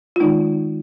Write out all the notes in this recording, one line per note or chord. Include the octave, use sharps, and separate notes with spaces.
F4
D#3 G#3 D#4